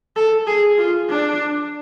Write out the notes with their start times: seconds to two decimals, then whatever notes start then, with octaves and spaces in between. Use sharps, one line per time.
0.16 A4
0.47 G#4
0.78 F4
1.09 D4